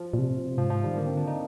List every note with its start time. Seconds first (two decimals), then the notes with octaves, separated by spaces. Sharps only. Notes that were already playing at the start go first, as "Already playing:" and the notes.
Already playing: F3
0.14 A#2
0.19 C3
0.57 G#2 F3
0.71 F3
0.84 D#3 G3
0.97 D3 A#3
1.07 C4
1.17 D4
1.27 D#4